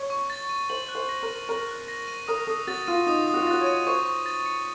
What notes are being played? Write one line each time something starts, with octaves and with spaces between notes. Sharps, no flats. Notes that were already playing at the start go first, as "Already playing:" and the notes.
Already playing: C#5
C#6
A6
D#7
C5 F#7
F#6
C5
A#6
A#4
D#7
A#4 F#7
F#6
A#6
D#7
A#4 D#6
A4 D#6
F#4 A6
F4 D#7
D#4 D#6
D#6
F#4
F4
F#4 A6
C#5
D#7
C5 C#6
C#6
A6
C#7